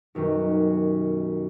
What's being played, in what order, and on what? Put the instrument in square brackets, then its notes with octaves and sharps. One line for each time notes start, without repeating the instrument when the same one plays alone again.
[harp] B1 F#2 D#3 G3